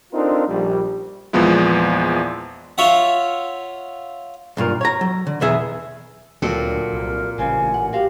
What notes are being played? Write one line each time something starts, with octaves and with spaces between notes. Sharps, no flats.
C4 D4 D#4 F4 A4 A#4
A#1 G3
E2 A#2 F3 G#3 B3 E4
F4 C#5 E5 F#5
B1 G2 A#2 A#4
C#5 A#5
F#3
D3
B1 E2 B3 G#4 E5
D2 A#2 F#3 C4 A4
C2 A#4
A1 C#3 G3 C4 G#5
F#5
F#4 G4 C5 F5